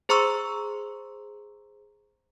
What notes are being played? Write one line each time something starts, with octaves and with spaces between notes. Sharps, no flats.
G#4 C5 A#5 C6 C#6 E6